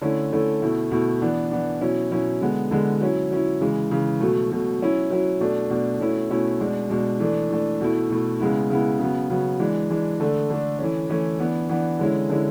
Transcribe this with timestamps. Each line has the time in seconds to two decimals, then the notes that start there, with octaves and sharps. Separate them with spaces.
0.01 D3 A3 C#4 E4
0.32 D3 A3 C#4 E4
0.62 B2 A3 E4
0.91 B2 A3 E4
1.22 E3 B3 D4
1.51 E3 B3 D4
1.81 B2 F#3 C#4 E4
2.11 B2 F#3 C#4 E4
2.41 D3 G#3 B3
2.71 D3 G#3 B3
3.01 F#3 C#4 E4
3.31 F#3 C#4 E4
3.61 C#3 E3 G#3
3.91 C#3 E3 G#3
4.21 B2 F#3 A3
4.51 B2 F#3 A3
4.81 F#3 C#4 E4
5.10 F#3 C#4 E4
5.40 B2 A3 D4
5.70 B2 A3 D4
6.00 B2 A3 C#4 E4
6.31 B2 A3 C#4 E4
6.60 B2 G#3 D4
6.90 B2 G#3 D4
7.20 E3 A3 D4
7.50 E3 A3 D4
7.81 B2 A3 E4
8.10 B2 A3 E4
8.40 C#3 G#3 B3 E4
8.70 C#3 G#3 B3 E4
8.99 C#3 F#3 B3
9.30 C#3 F#3 B3
9.59 E3 G#3 D4
9.90 E3 G#3 D4
10.20 D3 A3 D4
10.50 D3 A3 D4
10.79 E3 A3 C#4
11.10 E3 A3 C#4
11.40 E3 B3 D4
11.69 E3 B3 D4
11.99 D3 G#3 C#4 E4
12.29 D3 G#3 C#4 E4